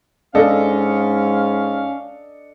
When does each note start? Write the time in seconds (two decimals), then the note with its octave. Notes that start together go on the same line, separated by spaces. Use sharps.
0.35 G#2 C#4 D4 A4 D#5 F5